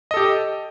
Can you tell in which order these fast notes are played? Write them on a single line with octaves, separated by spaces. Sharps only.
D#5 A4 G4